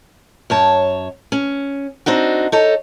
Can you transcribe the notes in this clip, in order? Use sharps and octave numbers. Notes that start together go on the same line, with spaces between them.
F#2 C#5 A5
C#4
C4 D4 D#4 F#4
D#4 A4 C#5